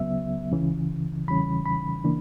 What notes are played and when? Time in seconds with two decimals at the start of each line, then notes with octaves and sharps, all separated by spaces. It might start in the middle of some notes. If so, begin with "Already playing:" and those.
Already playing: C#2 C#3 F#3 B3 E5
0.52 C#2 C#3 E3
1.28 E2 C#3 E3 G3 C#4 B5
1.66 B5
2.04 C#3 E3 A#3 D4